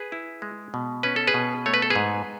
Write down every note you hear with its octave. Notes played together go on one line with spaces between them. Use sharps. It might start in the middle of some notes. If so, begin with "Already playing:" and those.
Already playing: G#4 B4
E4
G#3
B2
C#4 B4
A4
G#4 B4
B2
A3 C#5
B4
A4
G#4 B4
G#2